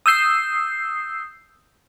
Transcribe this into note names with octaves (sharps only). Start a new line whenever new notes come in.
D#6 E6 G6 C7